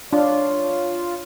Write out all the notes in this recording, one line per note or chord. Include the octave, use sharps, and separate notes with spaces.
D4 F4 C#5